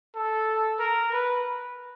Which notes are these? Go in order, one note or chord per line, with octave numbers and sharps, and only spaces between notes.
A4
A#4
B4